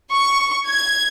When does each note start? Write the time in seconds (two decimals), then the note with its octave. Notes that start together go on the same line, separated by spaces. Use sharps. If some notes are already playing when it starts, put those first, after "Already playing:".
0.13 C#6
0.66 G#6